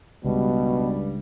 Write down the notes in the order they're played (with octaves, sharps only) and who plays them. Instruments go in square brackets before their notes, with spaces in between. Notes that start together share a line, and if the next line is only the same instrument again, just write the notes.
[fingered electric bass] C#2 [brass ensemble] G2 G3 [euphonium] B2